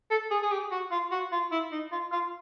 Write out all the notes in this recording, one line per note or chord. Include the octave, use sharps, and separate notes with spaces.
A4
G#4
G#4
G4
F#4
F4
F#4
F4
E4
D#4
F4
F4